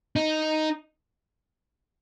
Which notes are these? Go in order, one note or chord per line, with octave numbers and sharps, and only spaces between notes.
D#4